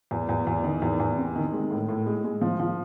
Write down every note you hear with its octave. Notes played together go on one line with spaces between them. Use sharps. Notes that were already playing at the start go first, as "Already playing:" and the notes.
E2
E2
E2
D#3
E2
E2
C3
D#3
G#3
A2
A2
G#3
G#3
F3
F3